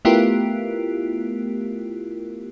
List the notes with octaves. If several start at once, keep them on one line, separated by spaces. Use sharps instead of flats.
A3 B3 E4 F4 G4 A#4